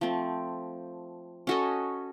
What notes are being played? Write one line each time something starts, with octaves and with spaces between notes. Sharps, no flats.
F3 A3 C4
C#4 F#4 A4 D#5